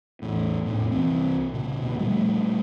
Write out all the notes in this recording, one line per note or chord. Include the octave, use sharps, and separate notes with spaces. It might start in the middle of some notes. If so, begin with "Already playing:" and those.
A1 E2 A2
F2 A2 C3
C2 E3 C4
A#2 C#3
D2 B2 B3
A#2 F3 G3 A3